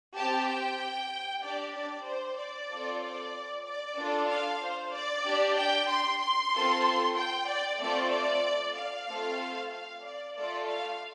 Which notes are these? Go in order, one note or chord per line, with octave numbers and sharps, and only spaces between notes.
C4 G4 A5
G5
D4 G4 D5
D5
C5
D5
C4 F4 A4
D5
D5
D4 F4 A4
F5
C5
D5
D4 G4
G5
C6
C6
C4 F4 A4
G5
D5
A3 C4 F4 A4 D5
D5
F5
A3 C4 F4 A4
F5
D5
A3 F4 A4 D5
F5